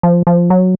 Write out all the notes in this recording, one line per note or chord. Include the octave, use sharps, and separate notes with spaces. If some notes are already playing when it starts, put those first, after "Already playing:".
F3
F3
F#3